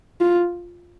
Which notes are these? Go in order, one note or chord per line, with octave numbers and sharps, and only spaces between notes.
F4